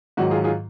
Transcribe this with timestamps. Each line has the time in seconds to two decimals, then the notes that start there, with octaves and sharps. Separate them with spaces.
0.17 G#2 D#3 F#3 F#4
0.31 F4 G#4
0.44 F4 G#4